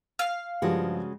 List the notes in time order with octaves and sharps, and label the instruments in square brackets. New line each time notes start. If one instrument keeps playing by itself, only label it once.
[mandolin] F5
[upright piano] G2 F3 [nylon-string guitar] C#3 G#3 F#4